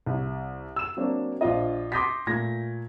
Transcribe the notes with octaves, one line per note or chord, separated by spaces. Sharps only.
C2
E6 E7
F#3 A#3 C4 D4
A#1 D4 F4 D#5
C6 D6 D#6 G6 A#6 B6
A#2 A3 G#6 A#6